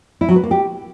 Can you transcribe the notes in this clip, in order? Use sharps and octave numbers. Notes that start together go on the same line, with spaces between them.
E4
F#3
B4
A#3
G4